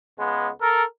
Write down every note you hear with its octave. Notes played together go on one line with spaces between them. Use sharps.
C#2 G#3 B3
A4 A#4